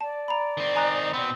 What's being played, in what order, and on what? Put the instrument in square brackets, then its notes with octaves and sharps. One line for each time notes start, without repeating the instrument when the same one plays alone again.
[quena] D5 [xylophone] A5
[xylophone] A#5 B5
[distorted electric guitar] D#3 C4
[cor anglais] D#4 [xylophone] G#5 A#5 F#6
[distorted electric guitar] B2 B3 [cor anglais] C4